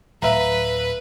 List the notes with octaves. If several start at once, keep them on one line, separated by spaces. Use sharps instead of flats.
D1 B4 E5 F5 A#5